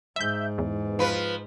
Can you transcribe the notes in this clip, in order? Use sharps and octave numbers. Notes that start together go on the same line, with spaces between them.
G#2 E5 G6
E2
F3 B4